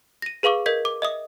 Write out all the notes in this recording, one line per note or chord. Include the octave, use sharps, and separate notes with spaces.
A#6 D#7
G#4 B4 F5 C#6 D6
A#4 D#5 G6 G#6 B6
D6
D#5 E5 D#6